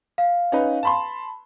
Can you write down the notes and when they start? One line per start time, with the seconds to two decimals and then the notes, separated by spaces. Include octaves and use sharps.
0.18 F5
0.52 C#4 D#4 B4
0.83 A5 B5 C6